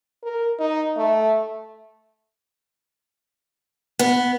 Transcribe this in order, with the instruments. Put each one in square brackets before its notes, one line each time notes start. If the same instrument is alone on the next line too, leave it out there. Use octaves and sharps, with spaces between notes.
[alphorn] A#4
D#4
A3
[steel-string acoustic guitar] B3